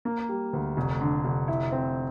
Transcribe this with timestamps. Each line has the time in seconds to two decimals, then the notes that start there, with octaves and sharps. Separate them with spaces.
0.05 A#3
0.29 G3
0.53 D2
0.77 F1
1.01 D3
1.25 F1
1.48 E4
1.72 C4